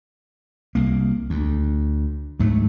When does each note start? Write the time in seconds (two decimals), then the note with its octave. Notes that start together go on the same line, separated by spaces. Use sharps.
0.75 C2 A#3
1.30 D2
2.39 D2 G#2 F#3 A3